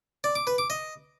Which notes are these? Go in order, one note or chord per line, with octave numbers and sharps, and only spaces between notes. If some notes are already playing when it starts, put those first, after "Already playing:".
D5
D6
B4
D6
D#5